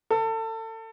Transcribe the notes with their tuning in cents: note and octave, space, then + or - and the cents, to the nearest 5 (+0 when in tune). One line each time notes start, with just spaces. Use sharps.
A4 +30